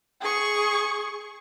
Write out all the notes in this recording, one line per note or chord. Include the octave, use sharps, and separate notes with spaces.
G#4 C#6